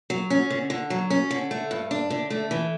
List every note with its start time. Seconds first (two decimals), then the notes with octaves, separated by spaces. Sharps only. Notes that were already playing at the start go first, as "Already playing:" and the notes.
0.10 F#3
0.30 C#4
0.50 D3
0.70 D3
0.90 F#3
1.10 C#4
1.30 D3
1.51 A3
1.71 G2
1.91 D4
2.10 D3
2.30 A3
2.51 E3